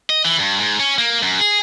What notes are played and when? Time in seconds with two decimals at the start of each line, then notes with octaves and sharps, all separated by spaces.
0.10 D#5
0.25 E3
0.39 G2
0.60 G#2
0.80 C#4
0.99 A#3
1.23 F#2
1.40 G#4